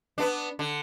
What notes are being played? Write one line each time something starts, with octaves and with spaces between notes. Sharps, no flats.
B3 D4
D3